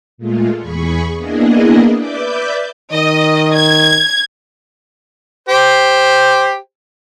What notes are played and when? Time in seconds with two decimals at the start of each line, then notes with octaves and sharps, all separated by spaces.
0.18 A#2 G#3 A3 F4
0.59 E2 G#4 B5 C#6
1.16 A#3 B3 D4 E4 G#4 D#5
1.96 B4 D5 E5 D6 G6
2.93 D#3 D#5
3.55 G#6
5.49 G4 C5